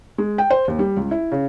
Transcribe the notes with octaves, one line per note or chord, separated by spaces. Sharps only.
G#3
G5
C5
D#2
G3
C#2
E4
C#3